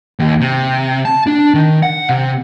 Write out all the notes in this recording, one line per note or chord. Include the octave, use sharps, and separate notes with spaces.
D#2
C3
A5
D4
D#3
F#5
C3